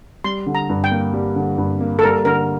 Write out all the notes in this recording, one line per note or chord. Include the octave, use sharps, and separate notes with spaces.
G3 C6
D3
A#5
G2
G5
A#3
G3
D3
G2
A#3
A4
G3 A#4
D3 A#4